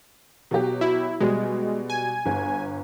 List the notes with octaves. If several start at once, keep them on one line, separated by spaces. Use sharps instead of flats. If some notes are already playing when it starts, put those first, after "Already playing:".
B2 F#3 G4
E4
B2 G3 G#3
G#5
G1